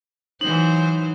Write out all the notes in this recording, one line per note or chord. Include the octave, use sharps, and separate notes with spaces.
E3 F#3 D#4 C5